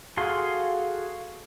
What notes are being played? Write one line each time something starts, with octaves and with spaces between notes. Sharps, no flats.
F#4 G#4 A4 F5 C6